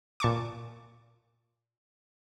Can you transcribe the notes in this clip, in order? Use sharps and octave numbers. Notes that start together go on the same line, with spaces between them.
A#2 A5 C#6 D6